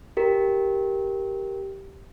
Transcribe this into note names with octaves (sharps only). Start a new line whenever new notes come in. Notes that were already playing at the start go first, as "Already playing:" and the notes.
G4 A#4